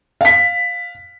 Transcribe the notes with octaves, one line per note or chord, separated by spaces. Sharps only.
F5 B6